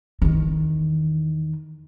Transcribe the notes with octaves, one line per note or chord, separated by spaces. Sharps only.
E2 D#3